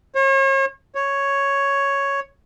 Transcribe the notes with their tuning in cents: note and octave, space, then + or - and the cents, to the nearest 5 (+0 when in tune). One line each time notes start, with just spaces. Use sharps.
C#5 -40
C#5 +0